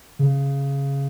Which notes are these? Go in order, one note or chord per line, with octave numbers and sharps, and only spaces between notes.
C#3